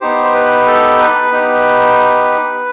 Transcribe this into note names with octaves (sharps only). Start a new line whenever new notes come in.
B3 D#4 G4 C5
C5
B4
A4
B4
B3 D#4 G4